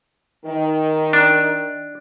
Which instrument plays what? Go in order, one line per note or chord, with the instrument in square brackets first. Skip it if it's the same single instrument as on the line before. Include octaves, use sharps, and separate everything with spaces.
[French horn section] D#3
[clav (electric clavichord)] D4